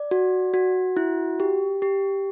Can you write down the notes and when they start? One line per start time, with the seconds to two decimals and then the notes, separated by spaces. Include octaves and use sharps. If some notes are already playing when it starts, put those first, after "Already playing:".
Already playing: D5
0.11 F#4
0.54 F#4
0.97 E4
1.40 G4
1.82 G4